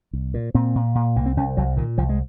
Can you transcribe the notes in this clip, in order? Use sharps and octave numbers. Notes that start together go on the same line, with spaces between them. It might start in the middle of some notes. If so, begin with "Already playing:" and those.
C2
A#2
A#2 C4
A#2
A#2
C2 A#3
C4
C2 C#4
C2 F#3
A#2 D#3
C2 F3
G#3